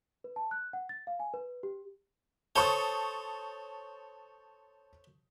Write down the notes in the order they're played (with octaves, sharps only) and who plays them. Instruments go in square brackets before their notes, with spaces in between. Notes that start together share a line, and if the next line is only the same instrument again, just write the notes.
[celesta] B4
A5
F#6
F#5
A6
F5
G#5
B4
G4
[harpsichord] A4 C5 C#5 [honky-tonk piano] A5 C#6 D#6